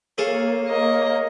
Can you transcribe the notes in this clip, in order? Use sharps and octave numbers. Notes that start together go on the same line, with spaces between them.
A#3 G#4 A4 C#5 F5
A#4 C#5 D#5